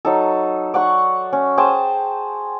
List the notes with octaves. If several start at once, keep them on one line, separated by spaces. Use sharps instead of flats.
F#3 D#4 A4
D5 F#5 C#6
C#4
G#4 C5 G5 A5